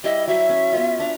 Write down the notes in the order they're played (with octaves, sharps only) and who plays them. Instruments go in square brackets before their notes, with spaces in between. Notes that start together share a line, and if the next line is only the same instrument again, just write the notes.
[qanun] G3 E4 E5 [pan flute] D#5
[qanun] F#3 [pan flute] E5
[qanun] C#4
B3 C#4 F4
D4 A#5